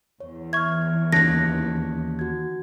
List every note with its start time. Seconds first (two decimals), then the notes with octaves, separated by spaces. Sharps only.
0.20 E2 C#5
0.53 E5 C#6 F6 G#6
1.12 D#2 C#3 A5 F#6 G#6 A#6
2.19 F#4 G#6